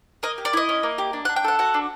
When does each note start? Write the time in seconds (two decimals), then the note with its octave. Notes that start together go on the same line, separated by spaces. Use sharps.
0.23 A#3 D#5
0.38 G4
0.45 D5
0.53 E4 D#5
0.69 C#4
0.83 A#3
0.98 G4
1.13 D4
1.25 F#5
1.29 D4
1.36 G5
1.44 A4 F#5
1.59 F#4 F#5
1.74 D4